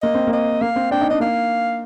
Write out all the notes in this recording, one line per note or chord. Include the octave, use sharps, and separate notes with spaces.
A#3 D#5
C4
A#3
D#5
A#3 F5
C4
D4 G5
D#4
D4 D#5
A#3 F5